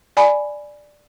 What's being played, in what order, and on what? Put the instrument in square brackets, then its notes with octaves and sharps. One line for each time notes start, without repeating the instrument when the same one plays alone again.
[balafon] D5 G#5 B5